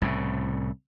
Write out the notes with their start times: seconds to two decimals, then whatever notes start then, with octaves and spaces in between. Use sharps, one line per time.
0.02 C2 A2 C#3